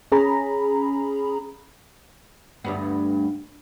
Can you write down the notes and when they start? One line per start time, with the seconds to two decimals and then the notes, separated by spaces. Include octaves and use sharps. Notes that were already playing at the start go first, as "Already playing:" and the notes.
0.12 C#4 G#4 A#5 B5
2.64 D2 G2 B3